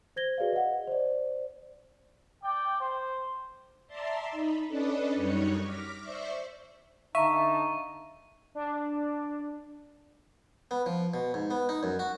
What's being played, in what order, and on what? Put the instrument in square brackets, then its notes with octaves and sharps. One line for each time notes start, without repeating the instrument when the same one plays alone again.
[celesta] C5 G#6 A#6 G7
F#4 G#4 B4 D5 F5
D#5 F#5
C5 D5
[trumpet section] D5 G5
C5
[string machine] D5 E5 A5 A#5 C6
D#4 B5
C#4 D4 A4 B4 D5 D#5
F#2 G3 D#4 C#5 C#6 F#6
D6 F6 A#6 B6
C5 D5 E5 C#6 D6
[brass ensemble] D3 D#4 A5 [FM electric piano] E5 [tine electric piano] F5 A#5 [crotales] C#6
[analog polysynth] D4
[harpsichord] B3
F3
B2
G#2
B3
D#4
F#2
F#4